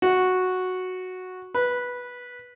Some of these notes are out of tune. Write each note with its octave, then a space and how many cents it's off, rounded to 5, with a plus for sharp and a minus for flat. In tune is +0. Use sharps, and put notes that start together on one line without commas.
F#4 -5
B4 -10